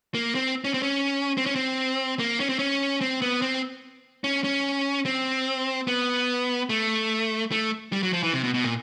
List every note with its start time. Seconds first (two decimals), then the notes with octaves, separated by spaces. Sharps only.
0.14 A#3
0.35 C4
0.64 C#4
0.74 C4
0.83 C#4
1.37 C4
1.46 C#4
1.55 C4
2.19 A#3
2.40 C#4
2.49 C4
2.59 C#4
3.01 C4
3.22 B3
3.42 C4
4.24 C#4
4.44 C#4
5.06 C4
5.87 B3
6.69 A3
7.52 A3
7.92 G3
8.03 F#3
8.13 F3
8.23 E3
8.33 C3
8.44 B2
8.54 B2
8.64 A#2